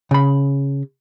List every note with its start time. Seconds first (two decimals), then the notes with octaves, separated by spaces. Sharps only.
0.11 C#3 B5